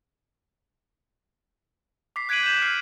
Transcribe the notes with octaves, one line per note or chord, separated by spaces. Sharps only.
D6 B6 C7
F#6 G#6 B6 D7 D#7 F#7
G6 E7
F6 C7